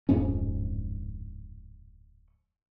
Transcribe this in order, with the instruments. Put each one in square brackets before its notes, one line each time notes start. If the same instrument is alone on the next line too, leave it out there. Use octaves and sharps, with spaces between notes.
[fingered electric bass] D1 F2 G#2 C#4